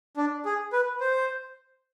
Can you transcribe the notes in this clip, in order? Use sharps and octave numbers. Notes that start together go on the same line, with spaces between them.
D4
G#4
B4
C5